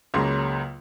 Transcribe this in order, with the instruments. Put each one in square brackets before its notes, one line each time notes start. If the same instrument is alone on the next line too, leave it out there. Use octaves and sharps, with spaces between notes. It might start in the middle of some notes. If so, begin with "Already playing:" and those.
[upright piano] C#2 C#3 F#3 A#3 C6